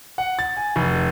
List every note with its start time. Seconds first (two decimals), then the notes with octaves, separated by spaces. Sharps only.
0.18 F#5
0.39 A6
0.57 G#5
0.76 F1